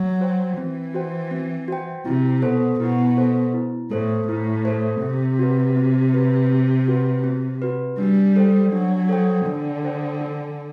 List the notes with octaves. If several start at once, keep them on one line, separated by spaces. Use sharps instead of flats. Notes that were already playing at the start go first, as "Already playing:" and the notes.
Already playing: F#3
F#4 C5 G5
E3 C4
F#4 C5 G5
C4
F#4 C5 G5
C3 E4
B2 A4 C5
B2 E4
A4 C5
E4
A2 A4 C5
A2 E4
A4 C5
C3 C4
F#4 B4
C4
F#4 B4
C4
F#4 B4
C4
F#4 B4
G3 D4
A4 C5 G5
F#3 D4
A4 C5 G5
D3 D4
A4 C5 G5
D4